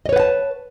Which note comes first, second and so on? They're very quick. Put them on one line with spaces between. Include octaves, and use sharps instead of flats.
D#5 C#5 B4 F#5 A5